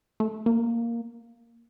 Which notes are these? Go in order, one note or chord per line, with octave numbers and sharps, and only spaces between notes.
A3
A#3